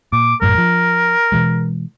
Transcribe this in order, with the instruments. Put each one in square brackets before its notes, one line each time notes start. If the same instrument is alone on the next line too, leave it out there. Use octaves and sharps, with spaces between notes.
[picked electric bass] A#2 [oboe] D6
[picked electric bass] A#1 F#2 A2 [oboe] A#4
[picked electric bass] F3
B2 E3 G#3